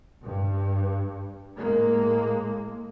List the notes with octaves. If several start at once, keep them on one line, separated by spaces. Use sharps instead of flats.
G2
A2 G#3 A#3